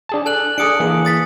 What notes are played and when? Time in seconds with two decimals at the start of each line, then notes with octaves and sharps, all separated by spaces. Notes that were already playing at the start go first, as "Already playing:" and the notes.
0.09 D4 G#4 A5
0.26 A4 G#5 F#6 F#7
0.58 D4 G#4 A4 D#6 C#7 D7
0.80 E3 A#3 G#4
1.05 D#6 A6 B6